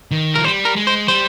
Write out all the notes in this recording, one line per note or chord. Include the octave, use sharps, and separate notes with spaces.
D#3
F3 A#4
G3 C5
A#4
G#3
C5
G3 C5